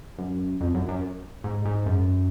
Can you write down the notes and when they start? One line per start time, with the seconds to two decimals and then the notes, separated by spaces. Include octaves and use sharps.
0.19 F#2
0.61 F2
0.75 F#2
0.88 F#2
1.44 G#2
1.65 G#2
1.86 F#2